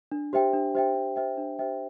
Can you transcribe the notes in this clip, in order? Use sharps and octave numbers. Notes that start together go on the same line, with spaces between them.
D4
G4 C5 E5 G5
D4
G4 C5 E5 G5
D4
G4 C5 E5 G5
D4
G4 C5 E5 G5